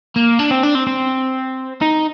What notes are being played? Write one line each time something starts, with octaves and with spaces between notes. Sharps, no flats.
A#3
D4
C4
D4
C4
C4
D#4